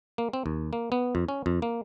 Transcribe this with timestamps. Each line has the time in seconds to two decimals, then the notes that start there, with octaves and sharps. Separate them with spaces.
0.18 A#3
0.33 C4
0.46 D#2
0.73 A#3
0.92 B3
1.15 F2
1.29 C#4
1.46 F2
1.62 A#3